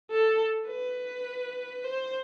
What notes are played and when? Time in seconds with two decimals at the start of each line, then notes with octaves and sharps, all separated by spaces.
0.11 A4
0.68 B4
1.84 C5